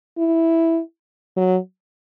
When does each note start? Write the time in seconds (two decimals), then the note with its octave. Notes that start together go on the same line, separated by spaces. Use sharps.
0.18 E4
1.37 F#3